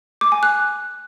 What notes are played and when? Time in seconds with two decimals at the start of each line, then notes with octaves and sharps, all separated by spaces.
0.21 D6
0.32 G#5
0.43 F#6